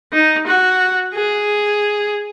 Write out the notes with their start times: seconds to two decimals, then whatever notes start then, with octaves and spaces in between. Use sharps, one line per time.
0.13 D#4
0.47 F#4
1.15 G#4